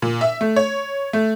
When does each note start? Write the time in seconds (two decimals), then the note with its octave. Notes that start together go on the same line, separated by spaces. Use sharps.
0.02 A#2
0.21 E5
0.41 A3
0.56 C#5
1.13 A3